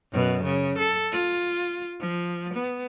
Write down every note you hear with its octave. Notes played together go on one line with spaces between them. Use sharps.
F#2 B2
C#3
A4
F4
F3
B3